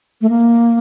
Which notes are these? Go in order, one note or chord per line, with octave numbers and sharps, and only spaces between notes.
A3
A#3